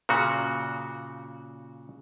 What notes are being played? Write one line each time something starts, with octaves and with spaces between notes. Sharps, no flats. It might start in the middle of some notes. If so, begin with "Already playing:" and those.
A#2 C#3 F#4